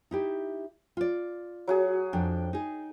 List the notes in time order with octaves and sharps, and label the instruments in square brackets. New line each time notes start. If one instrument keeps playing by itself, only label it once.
[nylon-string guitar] D#4 E4 G4
F4 D5
[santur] F#3 F#4 G#4
[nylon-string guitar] F2 D4 [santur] G5
[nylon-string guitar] D#4 G#4